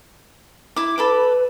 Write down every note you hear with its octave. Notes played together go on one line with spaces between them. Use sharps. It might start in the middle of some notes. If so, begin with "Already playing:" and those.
E4 D6
A4 B4 B5 D6